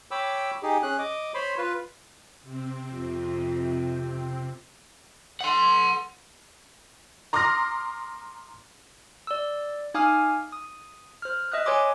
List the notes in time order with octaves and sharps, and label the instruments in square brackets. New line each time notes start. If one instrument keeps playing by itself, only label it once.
[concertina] C#5 G5 B5 D6 E6
D#4 G4 G#4
C#4 G#4 F#6
D#5 D6
C5 C#5 B5 C6
F4 B4
[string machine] C3 C4
[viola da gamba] F2
[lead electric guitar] F#5 C6
[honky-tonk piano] A#5 C6 D6 D#6 F6 A#6
[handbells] D5 E6
D#4 F5 G#5 D6 D#6 F6
D#6
C5 F6
D#5 E5 D#6 F#6
B4 C#5 G#5 C6 D6 D#6